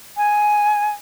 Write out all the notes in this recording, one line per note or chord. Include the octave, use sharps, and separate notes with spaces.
G#5